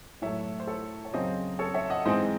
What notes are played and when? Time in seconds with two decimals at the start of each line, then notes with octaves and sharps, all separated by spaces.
0.22 A2 F#3 A3 C#5 E5
0.60 C5
0.67 A4 C#5
1.05 C#5
1.13 F#2 C#3 F#3 C4 C5 D#5
1.59 A4 C#5
1.74 C#5 E5
1.90 D#5 F#5
2.05 G#2 E3 G#3 C4 C5 D#5